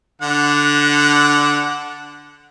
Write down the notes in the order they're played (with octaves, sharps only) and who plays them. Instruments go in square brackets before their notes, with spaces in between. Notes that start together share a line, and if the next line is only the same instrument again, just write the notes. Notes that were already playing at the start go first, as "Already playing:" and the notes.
[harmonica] D3 F#5